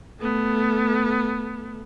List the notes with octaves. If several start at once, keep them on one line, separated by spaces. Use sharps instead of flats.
A3 B3